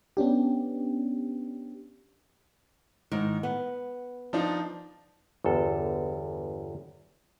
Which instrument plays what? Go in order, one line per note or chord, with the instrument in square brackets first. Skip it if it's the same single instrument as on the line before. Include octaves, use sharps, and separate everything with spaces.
[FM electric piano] B3 C#4 D4 G4
[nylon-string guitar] G#2 D#3
B3
[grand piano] F3 D4 D#4
[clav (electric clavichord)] G1 E2 A4